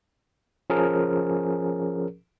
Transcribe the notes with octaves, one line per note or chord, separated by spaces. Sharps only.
F3 C#4 G#4 A#4